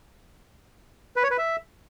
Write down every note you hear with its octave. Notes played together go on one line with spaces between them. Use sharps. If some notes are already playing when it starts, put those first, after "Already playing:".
B4
C#5
B4
E5